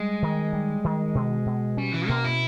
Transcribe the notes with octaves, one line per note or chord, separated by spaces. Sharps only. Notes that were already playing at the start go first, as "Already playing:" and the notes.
Already playing: G3 G#3
D#3
G3
D#3
B2
B2
G3 C#4
E3
B2 A#3
E4